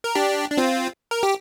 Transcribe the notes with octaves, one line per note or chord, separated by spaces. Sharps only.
A#4
D4 G4
D4
C4 F4
A#4
G4